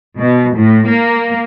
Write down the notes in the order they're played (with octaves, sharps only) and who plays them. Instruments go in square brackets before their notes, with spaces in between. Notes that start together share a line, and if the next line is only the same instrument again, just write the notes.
[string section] B2
A2
A#3